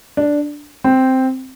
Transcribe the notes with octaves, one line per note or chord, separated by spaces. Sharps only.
D4
C4